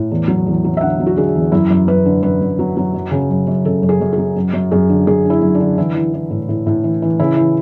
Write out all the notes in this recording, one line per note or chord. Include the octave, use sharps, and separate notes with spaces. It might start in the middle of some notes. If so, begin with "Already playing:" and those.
Already playing: A2
E2
F#3
E2
F#3
E5
D3 F#5
F#3
F#4
D3 G#4
E2
F#2 E4
F#2
F#2 B4
D3
F#2 B4
F#2
F#3
F#3
F#2
C#3
F#2
F#2
C#3 A4
F#2
G#4
F#2
G#4
F#3
F#2
F#2
F#2 G#4
D3
F#2 G#4
D3 E4
F#2
D4
D3
E3 E4
E3
E3
A2
A2
A2
E3
E3
C#3 E4
E3